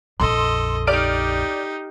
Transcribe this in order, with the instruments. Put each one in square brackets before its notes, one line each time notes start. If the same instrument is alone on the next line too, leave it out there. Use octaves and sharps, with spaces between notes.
[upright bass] A#1 F2 [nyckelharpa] A4 D#5 [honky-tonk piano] C6
[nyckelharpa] D#4 G4 [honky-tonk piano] D5 F6 D7